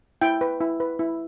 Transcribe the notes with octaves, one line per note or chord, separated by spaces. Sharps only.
E4 G5
B4
E4
B4
E4